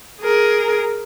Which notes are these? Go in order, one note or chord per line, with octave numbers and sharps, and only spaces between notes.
G#4 A#4